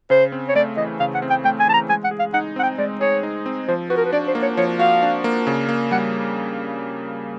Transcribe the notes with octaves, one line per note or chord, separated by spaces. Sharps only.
C#3 C5
C4
C#5
A3 D5
E3 D#5
C#3 F5
F#5
C4
G5
A3 G5
G#5
E3 A5
A#5
G#3 G#5
F#5
G#4
F5
D#4 F#5
C4 F#5
G5
G#3 D5
G#4 C#5
D#4
C4
F3 C5
F#4 B4
A#4
B4
D4 D5
C5
A#3
C#5
F3 C#5
F#4 F5
D4
A#3
C#3
A#3
G3 F#5